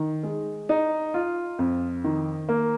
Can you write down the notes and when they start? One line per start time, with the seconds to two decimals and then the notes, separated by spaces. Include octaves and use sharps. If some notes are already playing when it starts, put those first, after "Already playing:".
Already playing: D#3
0.23 G#3
0.69 D#4
1.14 F4
1.59 F2
2.04 D#3
2.49 A#3